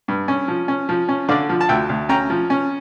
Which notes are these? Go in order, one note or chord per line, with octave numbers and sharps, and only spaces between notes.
G2
C#4
F3
C#4
F3
C#4
D3 D5 F5
F3
A5
D2 E5 G5
D2
C#4 G5 A#5
F3
C#4